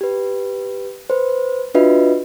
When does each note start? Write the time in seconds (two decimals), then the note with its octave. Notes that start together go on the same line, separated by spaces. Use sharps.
0.01 G4 B4
1.10 B4 C5
1.75 D4 F4 F#4 B4 D#5 E5